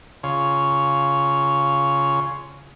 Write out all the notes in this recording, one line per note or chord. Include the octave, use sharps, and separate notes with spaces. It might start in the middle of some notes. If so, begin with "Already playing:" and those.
C#3 F4 C#5